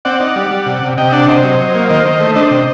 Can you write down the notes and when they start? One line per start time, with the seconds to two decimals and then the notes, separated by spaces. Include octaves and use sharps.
0.05 C4 D5 F#5
0.20 D#4
0.36 G3
0.51 G3
0.66 C3
0.83 C3
0.97 C3 D#5 G5
1.12 D4 D5 F#5
1.28 C3 C5 D#5
1.43 F#3
1.59 F#3
1.74 A#3
1.89 D#3 C5 D#5
2.05 D#3
2.20 A3
2.36 D4 C5 D#5
2.51 C3